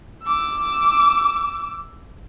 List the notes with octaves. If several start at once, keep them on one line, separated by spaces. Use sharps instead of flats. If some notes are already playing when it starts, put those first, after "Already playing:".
D6 E6